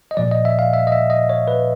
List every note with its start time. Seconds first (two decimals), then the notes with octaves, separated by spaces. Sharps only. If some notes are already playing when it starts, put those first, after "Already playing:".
0.11 D#5
0.17 A#2 F3 D5
0.31 D#5
0.45 E5
0.59 F5
0.73 E5
0.87 D#5
0.92 E5
1.10 D#5
1.29 C#5
1.48 B4